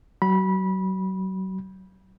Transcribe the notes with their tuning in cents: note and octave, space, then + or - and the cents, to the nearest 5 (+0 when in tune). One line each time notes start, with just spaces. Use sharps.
F#3 +30 B5 -20